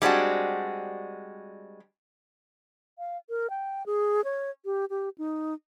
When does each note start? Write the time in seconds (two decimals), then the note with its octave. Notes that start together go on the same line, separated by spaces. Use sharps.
0.02 G3 G#3 C4 D4 F#4
2.98 F5
3.30 A#4
3.50 G5
3.86 G#4
4.24 C#5
4.65 G4
4.90 G4
5.18 D#4